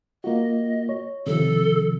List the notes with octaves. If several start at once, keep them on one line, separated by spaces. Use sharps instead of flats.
A#3 F4 F#4 D#5
C#5
C3 D#3 F3 A4